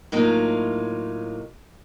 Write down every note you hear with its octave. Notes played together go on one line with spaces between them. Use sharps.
A2 F#3 A#3 D#4 F4